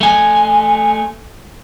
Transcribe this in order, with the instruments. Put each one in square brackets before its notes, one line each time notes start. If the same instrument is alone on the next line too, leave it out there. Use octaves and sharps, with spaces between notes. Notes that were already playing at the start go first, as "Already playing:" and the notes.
[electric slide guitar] A3 G#5